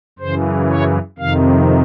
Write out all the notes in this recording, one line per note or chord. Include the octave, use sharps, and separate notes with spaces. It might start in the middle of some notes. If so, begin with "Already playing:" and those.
F#2 C#3 E3 C5
C#5
F2 C3 D#3 F5